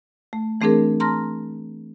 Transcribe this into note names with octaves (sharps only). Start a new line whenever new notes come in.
A3
E3 A3 C4 D4 G#4 A#4
A5 A#5 C6 F6 A#6